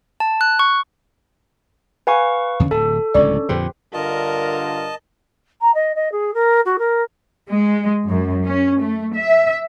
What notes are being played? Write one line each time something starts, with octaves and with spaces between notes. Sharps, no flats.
A5
F#6
C#6
B4 F5 F#5 G#5 B5 C#6
E2 D3 C#4
D1 A4 A5
D1 C#2 A2 C#4 D4 D5
F2 A#2 D3 G4 B4 C5
G2 D3 F4 A#4 D#5 A5
A#5
D#5
D#5
G#4
A#4
F#4
A#4
G#3
F#2
C#4
A3
E5